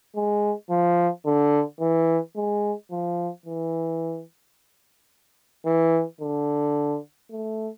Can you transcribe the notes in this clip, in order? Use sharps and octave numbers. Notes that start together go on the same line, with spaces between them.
G#3
F3
D3
E3
G#3
F3
E3
E3
D3
A3